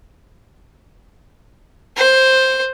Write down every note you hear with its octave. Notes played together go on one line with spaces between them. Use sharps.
C5